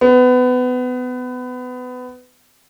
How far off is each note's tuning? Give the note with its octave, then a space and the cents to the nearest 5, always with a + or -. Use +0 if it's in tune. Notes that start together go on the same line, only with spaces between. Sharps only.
B3 +25